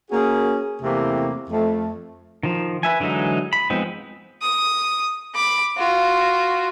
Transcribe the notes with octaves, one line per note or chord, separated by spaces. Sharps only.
A#3 C#4 F#4 G#4
E2 C3 A3 A#3 C4 E4
F2 A3
D#3 F3
B4 E5 G#5
D3 E3 F#3 G#3 D#4
B5
F3 G#3 B3 C4 D#4
D#6
B5 D6
F4 F#4